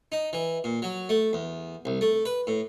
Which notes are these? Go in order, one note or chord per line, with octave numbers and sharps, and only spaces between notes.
D#4
E3
A#2
F#3
A3
E2
C2
A3
B4
A2